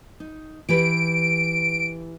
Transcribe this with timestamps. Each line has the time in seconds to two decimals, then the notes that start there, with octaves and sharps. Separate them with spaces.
0.20 D#4
0.69 E3 G4 B4 D7